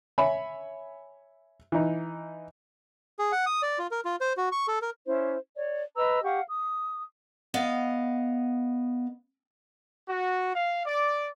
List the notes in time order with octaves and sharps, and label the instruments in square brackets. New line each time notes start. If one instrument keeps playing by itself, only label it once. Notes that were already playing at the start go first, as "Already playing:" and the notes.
[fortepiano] C#5 E5 G#5 B5
E3 D#4
[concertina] G#4
F#5
D#6
D5
F4
A#4
F4
C5
F#4
C#6
A4
A#4
[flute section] C#4 E4 C5
C#5 D5
B4 D#5 A#5 E6
G4 F5 F#5 C#6
D#6
[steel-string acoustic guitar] B3 D#5 F5
[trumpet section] F#4
F5
D5